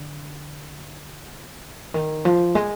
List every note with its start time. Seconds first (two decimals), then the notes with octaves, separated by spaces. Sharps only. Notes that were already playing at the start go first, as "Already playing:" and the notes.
Already playing: D3
1.94 D#3
2.25 F3
2.55 G#3